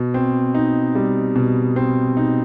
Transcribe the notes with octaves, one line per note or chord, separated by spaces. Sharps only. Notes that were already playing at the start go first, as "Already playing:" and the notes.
Already playing: B2
C4
D#4
G3
B2
C4
D#4